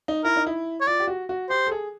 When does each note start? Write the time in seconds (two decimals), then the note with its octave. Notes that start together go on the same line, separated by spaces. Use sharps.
0.08 D#4
0.24 E4 A#4
0.36 D#4
0.47 E4
0.81 C#5
0.87 F4 D5
1.00 G4
1.08 F#4
1.29 F#4
1.49 G4 C5
1.67 A4
1.72 G#4